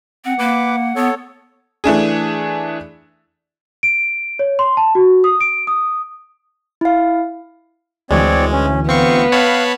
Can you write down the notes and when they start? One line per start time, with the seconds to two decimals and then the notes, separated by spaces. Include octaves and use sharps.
0.25 C4 F#5
0.39 A#3 B4 D6
0.96 B3 A4 C#5
1.84 E3 A3 D4 G#4
3.83 D7
4.39 C#5
4.59 C6
4.77 A5
4.95 F#4
5.24 D#6
5.41 D7
5.67 D#6
6.81 E4 F5
8.11 D2 E3 G#3 C4 C#5 D5
8.53 C#4
8.89 B3 C4 F5 C#6
9.32 C#5 F5 A5 B5 F#6